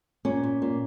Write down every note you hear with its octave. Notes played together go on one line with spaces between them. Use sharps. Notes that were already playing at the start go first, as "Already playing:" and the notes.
A#2 C#4
A#2
A#2